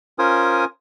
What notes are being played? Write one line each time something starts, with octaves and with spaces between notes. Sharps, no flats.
C#4 F4 A#4 C5 G#5 D#6